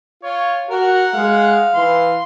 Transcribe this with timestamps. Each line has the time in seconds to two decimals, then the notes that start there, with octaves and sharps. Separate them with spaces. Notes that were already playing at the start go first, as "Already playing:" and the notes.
0.23 F4 C#5
0.70 F#4 A#4 F#5
1.13 G#3 F5
1.75 E3 C6